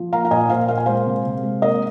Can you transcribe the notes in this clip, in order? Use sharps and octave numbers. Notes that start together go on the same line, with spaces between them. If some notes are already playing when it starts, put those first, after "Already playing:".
Already playing: F3
A#3 F5 A#5
F5
A#2 D#5 G#5
A#2 C5 F5
A#3 F5
G#5
G#3 C5 F5
C3
C3
G#3
A#3 A#4 D#5